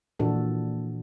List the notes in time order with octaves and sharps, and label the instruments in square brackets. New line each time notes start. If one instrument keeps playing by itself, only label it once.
[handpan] A#2 E3 F3 D4 F#4 A4